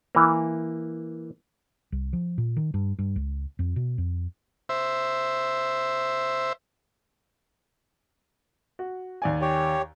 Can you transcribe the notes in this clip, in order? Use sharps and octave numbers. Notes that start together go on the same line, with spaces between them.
E3 A#3
C2
F3
A#2
D#3
G2
G2
C#2
F2
B2
F2
C5 E5
F#4
D#2 D5 G#5
G4 C#5